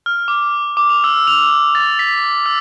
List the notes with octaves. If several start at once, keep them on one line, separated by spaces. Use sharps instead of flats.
F6
D6
D6
F7
E6
F7
A6
B6
E6